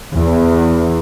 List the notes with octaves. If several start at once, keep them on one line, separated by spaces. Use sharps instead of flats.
E2